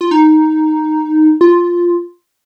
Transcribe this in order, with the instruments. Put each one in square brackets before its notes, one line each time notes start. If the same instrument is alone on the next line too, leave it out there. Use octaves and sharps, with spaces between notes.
[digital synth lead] F4
D#4
F4